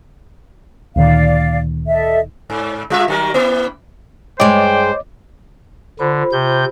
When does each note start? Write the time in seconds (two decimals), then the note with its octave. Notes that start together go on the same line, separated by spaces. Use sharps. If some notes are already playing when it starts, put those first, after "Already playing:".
0.96 D2 A#2 D#3 D5 F5
1.86 A4 D#5 E5
2.50 G#2
2.90 G3 F4 E5
3.08 D#3 F#3 A#4
3.34 A#3 E4 B4
4.40 G2 G#3 C5 C#5 D#5 G5 D6
5.99 D3 F4 C5 B5
6.32 C3 G6